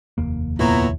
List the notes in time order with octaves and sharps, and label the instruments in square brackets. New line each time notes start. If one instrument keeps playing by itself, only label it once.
[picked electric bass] F1 D#2 A#3
[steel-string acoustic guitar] A#2 B3 A4 [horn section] E4 C#5 A#5